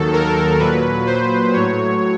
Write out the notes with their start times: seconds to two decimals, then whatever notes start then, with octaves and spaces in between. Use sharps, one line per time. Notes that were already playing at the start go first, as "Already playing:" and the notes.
Already playing: D#2 D#3 F#3 A4
0.13 A#4
0.60 A#2 F#3 B4
1.07 C5
1.53 A2 F#3 C#5